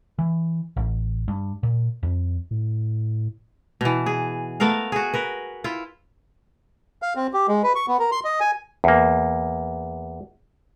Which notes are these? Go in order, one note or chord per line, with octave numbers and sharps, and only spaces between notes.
E3
A1
G2
A#2
F2
A2
B2 E3
G#4
A3 B3 A#4 F5
F#4 G#4
A#4 B4
E4 F4
F5
C4
G4
G#3
B4
C#6
B3
A#4
C6
D#5
G#5
E2 A#3